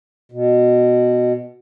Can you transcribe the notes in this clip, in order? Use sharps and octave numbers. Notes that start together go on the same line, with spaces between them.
B2